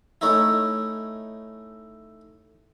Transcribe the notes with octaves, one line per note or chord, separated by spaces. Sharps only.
A3 C#4 D#4 E4